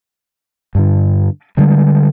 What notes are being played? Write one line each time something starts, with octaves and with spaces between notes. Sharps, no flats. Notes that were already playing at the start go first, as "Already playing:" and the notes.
G2 D3
D3 G3 G#3